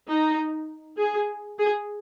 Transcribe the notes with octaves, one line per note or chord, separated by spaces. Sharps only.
D#4
G#4
G#4